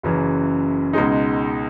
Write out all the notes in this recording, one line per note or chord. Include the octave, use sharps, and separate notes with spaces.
F#1 F#2 C#3 E3
C#2 B2 G#3 D#4